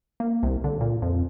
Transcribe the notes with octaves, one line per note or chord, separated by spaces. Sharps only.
A#3
C2
D3
A#2
F2